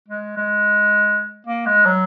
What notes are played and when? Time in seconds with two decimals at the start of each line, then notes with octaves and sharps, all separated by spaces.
0.08 G#3
0.37 G#3
1.47 A#3
1.66 G#3
1.86 F#3